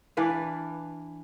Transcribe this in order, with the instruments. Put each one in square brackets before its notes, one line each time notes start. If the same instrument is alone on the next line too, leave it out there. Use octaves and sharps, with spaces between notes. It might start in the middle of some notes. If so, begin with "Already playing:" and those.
[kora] E3 D4 B4 F5